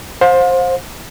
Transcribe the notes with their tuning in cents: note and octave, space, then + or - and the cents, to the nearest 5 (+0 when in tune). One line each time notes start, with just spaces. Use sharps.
C5 +15 F5 +40